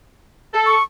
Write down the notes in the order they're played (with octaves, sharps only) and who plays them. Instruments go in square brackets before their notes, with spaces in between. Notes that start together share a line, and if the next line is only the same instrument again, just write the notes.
[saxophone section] A4
[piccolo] C#6